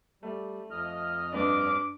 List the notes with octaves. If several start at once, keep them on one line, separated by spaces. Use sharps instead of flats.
G3 A3
F2 D#5 F6
G2 D4 B4 D5 D6